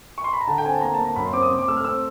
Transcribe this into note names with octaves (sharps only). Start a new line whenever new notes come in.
C#6
C6
B5
A#5
D3 A5
G5
C4 G#5
A5
A#3 A#5
A5
A#3
A#5
F#2 B5
C6
C4 D6
D#6
C3
D6
A3 E6
F6
C4 E6